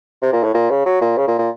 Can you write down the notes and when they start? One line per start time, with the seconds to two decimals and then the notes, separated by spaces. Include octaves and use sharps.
0.22 C3
0.33 A#2
0.44 A2
0.54 A#2
0.70 C#3
0.86 F#3
1.01 A#2
1.17 C#3
1.28 A#2
1.39 A#2